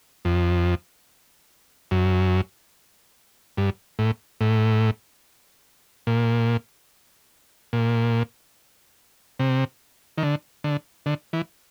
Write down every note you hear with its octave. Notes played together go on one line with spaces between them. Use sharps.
F2
F#2
G2
A2
A2
A#2
A#2
C3
D#3
D3
D3
D3
E3